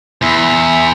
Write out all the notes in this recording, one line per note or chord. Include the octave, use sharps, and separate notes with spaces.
E2 E4 E5 C6